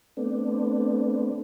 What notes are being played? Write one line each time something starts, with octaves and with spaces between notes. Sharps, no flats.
A3 B3 C4 D4